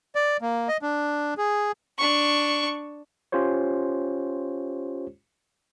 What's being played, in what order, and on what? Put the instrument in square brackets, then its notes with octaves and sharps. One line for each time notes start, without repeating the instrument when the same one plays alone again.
[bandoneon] D5
A#3
D#5
D4
G#4
[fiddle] D4 C#6
[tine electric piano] C#4 F4 G4 C5 C#5